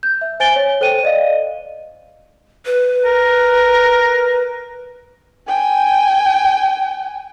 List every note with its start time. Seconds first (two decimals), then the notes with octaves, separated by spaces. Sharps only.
0.03 G6
0.21 E5
0.40 C5 G#5 A6 D7 G7
0.56 C#5
0.81 A4 C5 G5 D#7
1.03 D5 D#5 F5
2.66 B4
3.05 A#4
5.48 G5 G#5